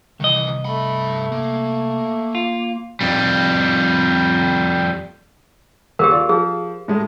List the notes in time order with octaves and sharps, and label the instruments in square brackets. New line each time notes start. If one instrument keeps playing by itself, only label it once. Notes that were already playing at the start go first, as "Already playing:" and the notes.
[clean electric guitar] C2 D#5 [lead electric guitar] D#3 E3
[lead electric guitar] G2 B5 [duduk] A3
[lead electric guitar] A#3
[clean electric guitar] F4
[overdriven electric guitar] F2 G3
[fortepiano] D#2 [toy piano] G4 G#4 A#4
[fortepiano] F4 D5
[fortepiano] F3 [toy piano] G#4
[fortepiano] A2 G#3 A3